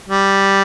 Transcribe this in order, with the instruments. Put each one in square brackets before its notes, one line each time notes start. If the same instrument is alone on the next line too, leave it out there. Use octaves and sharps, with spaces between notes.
[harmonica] G3